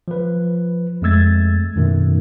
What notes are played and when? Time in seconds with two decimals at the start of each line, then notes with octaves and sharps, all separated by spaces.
0.08 F3 B4
1.02 F2 G#3 A3 E6 G#6 A6
1.76 F#2 B2 D#3 A3